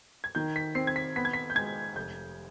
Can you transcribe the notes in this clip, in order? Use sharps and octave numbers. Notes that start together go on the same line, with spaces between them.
G#6
D#3 G6
B6
C4 C7
G#6
B6
B3 B6
G#6
B6
G6
G#3 G#6
F1 G6